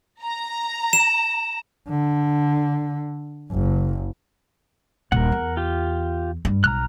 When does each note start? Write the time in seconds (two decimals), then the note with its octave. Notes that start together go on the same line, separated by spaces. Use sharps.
0.22 A#5
0.93 E7
1.89 D3
3.51 F#1
5.12 D#1 A#1 A#4 F#5
5.32 E2
5.57 F4 G4
6.45 G2
6.64 B1 A#5 F6 F#6